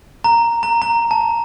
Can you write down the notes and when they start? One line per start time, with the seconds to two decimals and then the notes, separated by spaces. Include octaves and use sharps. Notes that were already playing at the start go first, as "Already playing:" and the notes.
0.24 A#5
0.63 A#5
0.82 A#5
1.11 A5